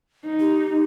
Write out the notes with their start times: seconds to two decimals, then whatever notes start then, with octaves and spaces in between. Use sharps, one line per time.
0.25 D#4
0.40 G4